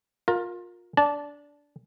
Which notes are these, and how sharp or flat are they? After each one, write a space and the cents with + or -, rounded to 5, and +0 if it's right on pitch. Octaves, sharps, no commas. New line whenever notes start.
F4 +25 A#4 +0
D4 -15 A5 -15